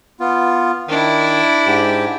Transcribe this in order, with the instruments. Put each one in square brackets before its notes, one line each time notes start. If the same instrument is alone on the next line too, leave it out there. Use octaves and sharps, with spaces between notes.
[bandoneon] B3 F4
[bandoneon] D#3 [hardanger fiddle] D4 E4
[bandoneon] G#2 G4